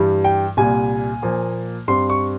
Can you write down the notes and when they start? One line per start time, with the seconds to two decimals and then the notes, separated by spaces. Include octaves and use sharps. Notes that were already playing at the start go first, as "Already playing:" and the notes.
Already playing: G2 E3 G3
0.24 G5
0.57 C2 A#2 G3 G#5
1.22 A#2 F3 A#3
1.88 G2 G3 C4 C6
2.10 C#6